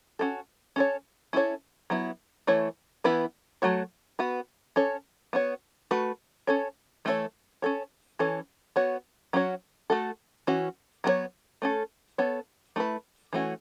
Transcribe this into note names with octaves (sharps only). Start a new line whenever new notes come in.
C#4 F#4 A4
C#4 A4 C#5
C#4 E4 A4 C#5
F#3 B3 E4
E3 A3 E4 C#5
E3 B3 E4 B4
F#3 A3 F#4 C#5
B3 F#4 B4
C#4 A4 C#5
B3 F#4 C#5
A3 F#4 B4
C#4 A4 C#5
E3 A3 C#4 A4 C#5
C#4 A4 C#5
E3 C#4 A4 C#5
B3 F#4 C#5
F#3 C#4 F#4 C#5
A3 F#4 A4
E3 C#4 F#4
F#3 B3 A4 C#5
A3 C#4 A4
B3 A4 C#5
A3 E4 B4
E3 A3 C#4 F#4